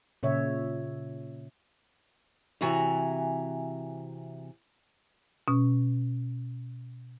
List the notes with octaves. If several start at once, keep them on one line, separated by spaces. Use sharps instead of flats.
A#2 C#3 C#5 E5
C3 E3 F#4 E5 G#5 A#5
B2 C#4